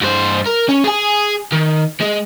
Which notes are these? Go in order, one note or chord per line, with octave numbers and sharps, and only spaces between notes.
G2 C5
A#4
C#4
G#4 G#5
D#3
G#3